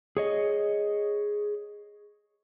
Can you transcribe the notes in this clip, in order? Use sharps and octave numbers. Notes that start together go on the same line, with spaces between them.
G#4 C#5 D#5